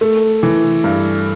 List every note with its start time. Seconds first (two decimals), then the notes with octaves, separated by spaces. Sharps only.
0.01 A3
0.43 E3
0.84 G2